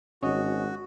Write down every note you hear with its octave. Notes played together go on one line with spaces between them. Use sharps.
G#1 C#4 F#4 C#5 D#5